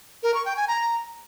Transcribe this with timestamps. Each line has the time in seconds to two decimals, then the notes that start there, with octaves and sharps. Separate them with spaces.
0.23 A#4
0.34 C#6
0.46 G5
0.57 G#5
0.68 A#5